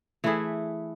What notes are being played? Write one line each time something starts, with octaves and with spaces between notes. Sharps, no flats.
E3 A3 E4 G#4